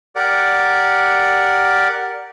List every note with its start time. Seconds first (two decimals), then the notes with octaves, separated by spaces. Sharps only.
0.16 G4 A#4 D5 F#5